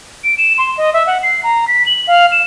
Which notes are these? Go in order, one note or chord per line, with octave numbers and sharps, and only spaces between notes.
D7
E7
C6
D#5
E5
F#5
C7
A#5
B6
F#7
F5
E7